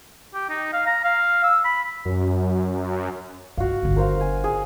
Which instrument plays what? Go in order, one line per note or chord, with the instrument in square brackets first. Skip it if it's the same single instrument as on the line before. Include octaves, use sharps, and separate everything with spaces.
[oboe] G4
D#4
F5
A#5
F5
E6
B5
[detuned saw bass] F#2
[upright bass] G2 [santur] F#4 F5
[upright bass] G1 D3
[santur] A#4 C5 F5
G#5
G#4